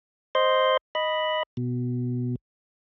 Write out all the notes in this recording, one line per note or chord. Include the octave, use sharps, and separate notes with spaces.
C5 D#5 C6
D#5 B5
B2